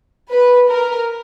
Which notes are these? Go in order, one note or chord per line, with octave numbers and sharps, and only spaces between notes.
B4
A#4